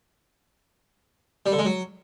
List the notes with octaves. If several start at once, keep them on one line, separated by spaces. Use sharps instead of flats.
G3
D3
G#3
F#3